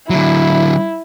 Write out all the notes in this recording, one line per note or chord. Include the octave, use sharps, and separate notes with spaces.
D3 F#3 E4